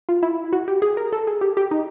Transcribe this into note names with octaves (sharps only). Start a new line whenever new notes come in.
F4
E4
F#4
G4
G#4
A#4
A4
G#4
G4
G4
D#4